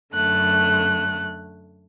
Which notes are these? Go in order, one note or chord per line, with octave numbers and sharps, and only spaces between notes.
F#2 D3 A3 F#6